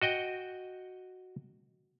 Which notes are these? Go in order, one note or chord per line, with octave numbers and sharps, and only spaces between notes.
F#4 D#5 G5